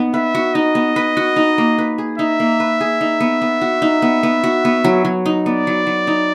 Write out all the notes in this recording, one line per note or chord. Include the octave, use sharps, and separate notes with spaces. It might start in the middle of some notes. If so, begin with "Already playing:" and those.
Already playing: B3 D#4
B4 E5
F#4
D#4 D#5
B3
B4
F#4
D#4
A#3
B4
G#4
D#4 E5
A#3
B4
G#4
D#4
B3
B3
F#4
D#4
B3
B3
F#4
B3
F#3
F#3
D#4
B3 D5
F#3
F#3
D#4